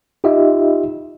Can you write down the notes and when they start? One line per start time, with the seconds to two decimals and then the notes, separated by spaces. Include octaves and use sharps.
0.24 D#4 F4 G4 D#5 E5